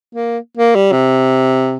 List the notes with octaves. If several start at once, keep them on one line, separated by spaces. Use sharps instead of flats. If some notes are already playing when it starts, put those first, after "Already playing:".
A#3
A#3
G3
C3